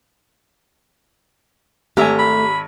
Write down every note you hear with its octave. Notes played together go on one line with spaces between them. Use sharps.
G#1 A3 G4 E5 G#5 A#5
B5